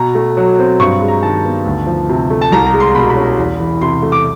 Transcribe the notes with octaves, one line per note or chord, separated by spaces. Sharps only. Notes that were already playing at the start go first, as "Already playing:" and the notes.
Already playing: B2 A#5
A3
F#3
C4
G2 C#6
G#3
A#5
D#3 A5
B3
D2
F3
C3
A3
A5
C2 A#5
A#5
G#3
C6
B2 B5
A#5
B5
C#4
E2
E3
C3 C6
A3
D6